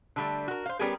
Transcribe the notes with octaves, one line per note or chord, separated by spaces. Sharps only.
D3 G3 A3
F#4 A#4
C5 F5
G3 B3 C#4 G4 G#4 A#4